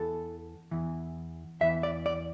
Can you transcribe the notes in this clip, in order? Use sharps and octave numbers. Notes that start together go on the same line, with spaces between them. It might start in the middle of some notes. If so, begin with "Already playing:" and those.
Already playing: E2 E3 A4
E2 E3
E2 E3 E5
D5
D5